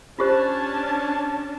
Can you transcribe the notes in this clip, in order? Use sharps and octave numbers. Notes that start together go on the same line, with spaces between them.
C#4 D4 F4 G4 C5 A5